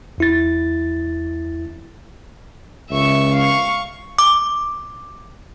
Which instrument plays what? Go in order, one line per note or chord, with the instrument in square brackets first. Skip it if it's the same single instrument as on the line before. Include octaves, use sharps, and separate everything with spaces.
[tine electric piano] E2 E4 A6
[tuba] C#2 [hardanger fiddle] E5 C#6
[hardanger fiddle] F5 C#6
[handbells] D6